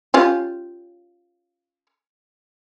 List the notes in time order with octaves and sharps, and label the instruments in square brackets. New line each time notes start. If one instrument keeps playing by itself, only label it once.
[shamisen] C#4 F4 G4